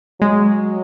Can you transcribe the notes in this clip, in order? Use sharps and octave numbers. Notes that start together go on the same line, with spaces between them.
F#3 G#3